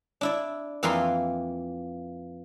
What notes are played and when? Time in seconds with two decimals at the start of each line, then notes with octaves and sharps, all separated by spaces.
0.21 D4 E4 D5
0.83 F2 E3 A#3 A#4 B4 C6